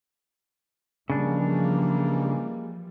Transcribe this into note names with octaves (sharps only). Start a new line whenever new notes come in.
C#3 E3 F3 G3 G#3 A#3 D4